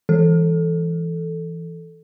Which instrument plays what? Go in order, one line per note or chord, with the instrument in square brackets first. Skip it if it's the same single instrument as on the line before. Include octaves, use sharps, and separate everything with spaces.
[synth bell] E3 A4